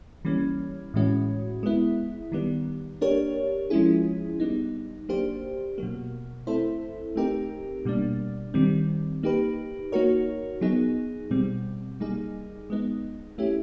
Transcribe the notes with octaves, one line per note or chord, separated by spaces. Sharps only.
E3 G3 A#3 C#4
A2 E3 G#3 C#4 F#4
G#3 B3 E4
D#3 G3 B3
A#3 D4 G4 A#4 C#5
F3 G#3 C#4 E4 G#4
G3 B3 D#4
F#3 A#3 D4 G4 C5
B2 F#3 A#3
A3 C4 E4 A4 C5
A3 C4 D#4 G4 A#4
B2 G3 A#3 D4
D#3 G3 C4
A#3 D#4 G4 B4
A#3 D#4 F#4 A#4 C#5
F#3 B3 D#4 G#4
B2 G3 C4
G3 A#3 D#4 G#4
G#3 B3 D#4
A3 C#4 E4 G4